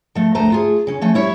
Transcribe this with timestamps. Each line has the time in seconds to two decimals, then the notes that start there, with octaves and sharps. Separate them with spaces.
0.15 F3 A3
0.35 D2 A3 C5 A#5
0.50 A3 F4 G#4
0.87 C#3 C#4
1.01 F3 A3 C#4
1.14 G3 E4 C#5